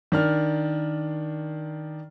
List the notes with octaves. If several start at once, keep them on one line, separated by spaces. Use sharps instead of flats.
D#3 D4 F6